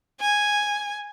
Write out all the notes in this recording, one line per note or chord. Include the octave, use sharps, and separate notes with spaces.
G#5